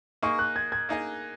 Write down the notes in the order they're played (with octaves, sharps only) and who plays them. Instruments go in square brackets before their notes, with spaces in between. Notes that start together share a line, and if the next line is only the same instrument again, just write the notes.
[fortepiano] A#3 D#4 G#4 D#5 [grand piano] C#6
[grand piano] F#6
G#6
G#6
[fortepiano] A#3 D#4 G#4 D#5